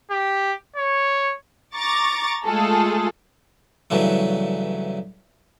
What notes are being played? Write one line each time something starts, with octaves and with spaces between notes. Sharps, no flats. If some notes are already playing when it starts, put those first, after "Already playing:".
G4
C#5
A#5 C#6 D6 A6
G#3 A3 F4 G#4 A4
G2 C#3 E3 F#3 A3